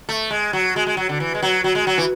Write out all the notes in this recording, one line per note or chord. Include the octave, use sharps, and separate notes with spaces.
A3
G#3
F#3
G#3
G#3
F#3
D3
E3
G#3
F#3
F#3
G#3
F#3
E3